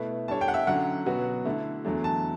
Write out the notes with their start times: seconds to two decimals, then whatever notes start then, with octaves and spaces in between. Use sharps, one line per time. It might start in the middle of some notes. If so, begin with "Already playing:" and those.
Already playing: B2 A3 E4 B4
0.28 G3 D4 A4 C#5 A5
0.41 G5
0.48 F#5
0.54 E5
0.67 D3 F#3 C#4 F#5
1.06 B2 F#3 B3 F#4 B4
1.45 D3 A3 E4
1.85 E2 D3 F#3 A3
2.04 A5